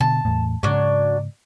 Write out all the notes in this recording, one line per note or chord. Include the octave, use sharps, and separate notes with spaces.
B2 D3 A5
E2 A2
G#2 C#3 F#3 D4